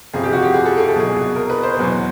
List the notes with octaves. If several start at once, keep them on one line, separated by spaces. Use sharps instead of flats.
G1 F2 C3 F3 G#4
G4
F#4
G4
G#4
A4
G#4
A4
C2 B2 F#3 G#4
A#4
B4
C5
E2 B2 F#3